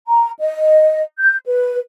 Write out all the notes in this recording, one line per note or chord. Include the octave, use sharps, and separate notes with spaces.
A#5
D#5
G6
B4